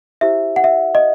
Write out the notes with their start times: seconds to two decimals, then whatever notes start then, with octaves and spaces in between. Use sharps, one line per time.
0.21 E4 G4 C5 E5
0.56 F#5
0.64 E5
0.95 D#5